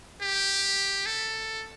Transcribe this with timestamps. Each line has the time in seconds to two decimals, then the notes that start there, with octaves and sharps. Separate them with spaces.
0.22 G4
1.06 A4